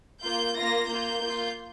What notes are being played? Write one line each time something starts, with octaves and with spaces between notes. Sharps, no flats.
A#3 F4 G6
A#3 F4 A#6
A#3 F4 G6
A#3 F4